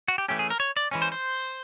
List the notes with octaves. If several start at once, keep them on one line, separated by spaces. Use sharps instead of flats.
F#4
G4
E3 A3 C#4 G4
G#4
A#4
C#5
D5
E3 G#3 C#4
C5
C5